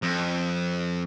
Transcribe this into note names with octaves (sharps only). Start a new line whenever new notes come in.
F2